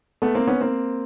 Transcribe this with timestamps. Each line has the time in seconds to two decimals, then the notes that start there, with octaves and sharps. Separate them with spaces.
0.22 A3 B3
0.34 A#3 C4
0.47 B3 C#4
0.61 A#3 C4